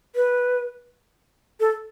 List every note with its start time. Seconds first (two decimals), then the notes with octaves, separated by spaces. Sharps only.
0.15 B4
1.60 A4